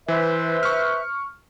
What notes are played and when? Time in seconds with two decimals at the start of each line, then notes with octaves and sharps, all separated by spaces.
0.08 E3 B4 C5 E5
0.63 C#6 F6